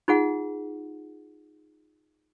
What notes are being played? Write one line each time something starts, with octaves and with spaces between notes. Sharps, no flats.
D#4 F4 G#4 F#5